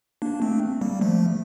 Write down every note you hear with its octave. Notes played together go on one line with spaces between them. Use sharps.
A#3 D4
A3 C4
G3 A#3
F3 A3